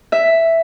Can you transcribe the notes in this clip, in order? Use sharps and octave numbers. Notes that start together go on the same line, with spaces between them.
E5